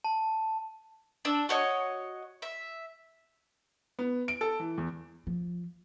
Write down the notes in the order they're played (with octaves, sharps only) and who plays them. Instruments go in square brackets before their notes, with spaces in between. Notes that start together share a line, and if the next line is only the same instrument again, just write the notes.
[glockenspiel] A5
[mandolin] D4 E6
F#4 C#5 D#5
E5
[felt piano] B3
D7
A4
E3
E2
[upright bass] F3